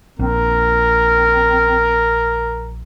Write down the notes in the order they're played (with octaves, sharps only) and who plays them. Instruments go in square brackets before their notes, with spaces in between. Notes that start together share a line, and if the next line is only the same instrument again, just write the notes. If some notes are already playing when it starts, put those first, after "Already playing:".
[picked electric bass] A#1 [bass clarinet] C4 [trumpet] A#4